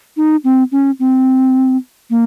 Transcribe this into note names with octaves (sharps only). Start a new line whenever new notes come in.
D#4
C4
C#4
C4
A#3